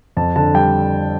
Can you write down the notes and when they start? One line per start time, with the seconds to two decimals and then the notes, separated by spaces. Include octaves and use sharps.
0.17 F2 A5
0.36 D3 A5
0.54 G3 G5